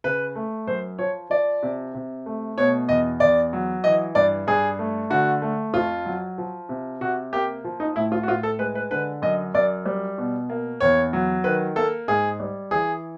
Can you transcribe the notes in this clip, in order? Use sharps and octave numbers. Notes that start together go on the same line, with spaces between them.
C#3 B4
A3
F#2 C5
F3 C#5
F3 D5
C3
C3
A3
B2 C#5
E2 D#5
E2 D5
F#3
E3 D#5
G2 D5
G2 G#4
A3
D3 F#4
A3
F2 F4
F#3
F3
C3
C3 F#4
A#3 G4
F3
D#4
A2 E4
F4
F#4
A2 F4
A4
G#3 B4
B4
D3 B4
F#2 D#5
F#2 D5
G3
B2
A#3
E2 C#5
F#3
D#3 B4
A#3 A4
G#2 G#4
G3
E3 G#4